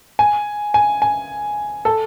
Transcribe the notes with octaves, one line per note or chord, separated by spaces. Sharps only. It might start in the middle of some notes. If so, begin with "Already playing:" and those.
G#5
G#5
G#5
A4